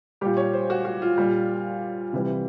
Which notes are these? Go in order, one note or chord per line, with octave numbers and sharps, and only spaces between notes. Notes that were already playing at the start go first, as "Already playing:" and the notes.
A#2 G3 G4
C#5
C5
F#4
F#4
F4
A#2 G3
C3 E3 G3 E4